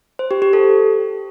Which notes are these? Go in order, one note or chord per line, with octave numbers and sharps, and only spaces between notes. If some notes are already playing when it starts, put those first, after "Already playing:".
C5
G4
G4
A4